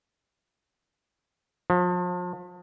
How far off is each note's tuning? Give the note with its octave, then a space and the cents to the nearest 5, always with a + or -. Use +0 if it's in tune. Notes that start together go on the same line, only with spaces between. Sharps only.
F3 +35